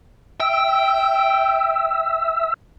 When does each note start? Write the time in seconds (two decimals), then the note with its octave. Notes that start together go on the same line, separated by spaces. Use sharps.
0.40 E5 G5 E6